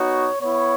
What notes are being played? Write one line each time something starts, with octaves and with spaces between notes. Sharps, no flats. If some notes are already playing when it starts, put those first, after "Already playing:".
Already playing: B3 D#4 F#4 C#5
B3 E4 C#5